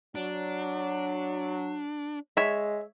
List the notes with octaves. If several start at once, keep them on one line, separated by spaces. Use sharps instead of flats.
F#3 D4
G#3 C#5 E5